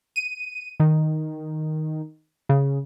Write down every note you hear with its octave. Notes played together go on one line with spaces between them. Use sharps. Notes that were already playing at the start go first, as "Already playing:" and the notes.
D#7
D#3
C#3